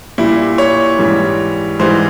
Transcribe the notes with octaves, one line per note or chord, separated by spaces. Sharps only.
A#2 G3 E4
C#5
G#2 E3 G3
G#2 E3 G3 C5